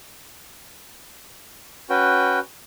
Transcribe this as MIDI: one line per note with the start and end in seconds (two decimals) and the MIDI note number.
1.90 2.39 61
1.90 2.39 66
1.90 2.39 71
1.90 2.39 79